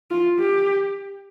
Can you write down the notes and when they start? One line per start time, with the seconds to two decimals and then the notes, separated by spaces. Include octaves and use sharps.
0.11 F4
0.39 G4